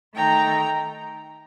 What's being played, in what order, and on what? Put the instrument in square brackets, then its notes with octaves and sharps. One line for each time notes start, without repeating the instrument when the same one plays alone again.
[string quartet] D#3 A3 D#4 G5 A#5